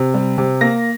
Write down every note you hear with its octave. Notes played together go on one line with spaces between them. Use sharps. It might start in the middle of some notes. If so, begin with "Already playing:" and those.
Already playing: C3
G3
C3
A#3 A#6